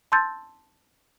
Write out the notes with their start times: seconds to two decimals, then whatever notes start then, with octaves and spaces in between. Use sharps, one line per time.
0.12 A5 C6 E6 G6 A6